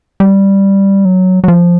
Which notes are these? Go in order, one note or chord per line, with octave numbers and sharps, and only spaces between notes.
G3
F#3
F#3
F3